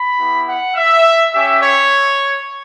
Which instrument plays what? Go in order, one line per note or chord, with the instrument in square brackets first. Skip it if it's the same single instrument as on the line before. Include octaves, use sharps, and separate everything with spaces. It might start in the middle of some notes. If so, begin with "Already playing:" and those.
Already playing: [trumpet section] B5
B3 E4 G4
F#5
E5
C#4 G4 E5
C#5